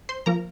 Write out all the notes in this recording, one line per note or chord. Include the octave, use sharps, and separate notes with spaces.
C5 C6
F3 A#3 A#4 A#5